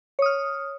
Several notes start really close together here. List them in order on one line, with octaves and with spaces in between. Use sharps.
C#5 D#6 F6